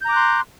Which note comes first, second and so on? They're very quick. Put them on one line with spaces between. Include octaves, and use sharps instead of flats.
G6 A#5 D6 F#6 C6